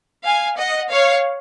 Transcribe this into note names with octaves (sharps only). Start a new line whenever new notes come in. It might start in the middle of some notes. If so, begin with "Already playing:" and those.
F5 G#5
D#5 F#5
C#5 F5